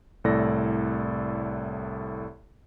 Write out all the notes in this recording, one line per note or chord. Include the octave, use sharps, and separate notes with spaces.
C2 A2 A4 D5 A#6